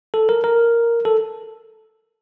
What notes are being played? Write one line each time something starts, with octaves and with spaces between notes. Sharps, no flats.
A4
A#4
A#4
A4